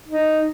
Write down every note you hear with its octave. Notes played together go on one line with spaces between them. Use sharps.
D#4